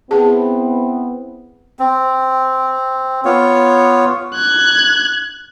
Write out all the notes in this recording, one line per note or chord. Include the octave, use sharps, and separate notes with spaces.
B3 C4 E4 G#4 A5
C4
B3 F4 C#5
F#6 G#6